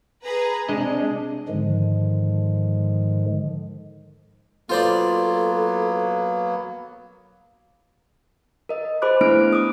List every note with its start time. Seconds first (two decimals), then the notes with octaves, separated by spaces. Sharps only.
0.24 G#4 B4 A#5
0.69 C3 G#3 D4 D#5
1.49 G#2 D3 D#3 F3 G#3
4.70 F#3 A#3 B3 F4 A4 C5 D5
8.69 A#4 D#5
9.02 G#4 C5 B5 D6 F#6
9.21 A3 B3 D4 E4 F6 D7
9.53 D6 D#6